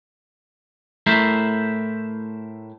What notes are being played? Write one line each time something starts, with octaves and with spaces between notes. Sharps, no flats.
A2 A3 E4 A#4 C5 E5